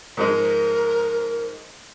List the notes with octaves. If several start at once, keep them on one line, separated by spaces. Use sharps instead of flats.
G#2 F3 G#3 A#4